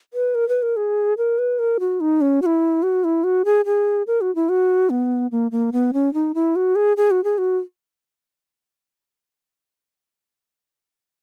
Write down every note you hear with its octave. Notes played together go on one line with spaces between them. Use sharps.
B4
A#4
B4
A#4
G#4
A#4
B4
A#4
F#4
D#4
C#4
F#4
E4
F#4
E4
F#4
G#4
G#4
A#4
F#4
E4
F#4
B3
A#3
A#3
B3
C#4
D#4
E4
F#4
G#4
G#4
F#4
G#4
F#4